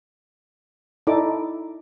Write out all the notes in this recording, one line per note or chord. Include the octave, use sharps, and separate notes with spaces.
D#4 E4 A4 D5 D6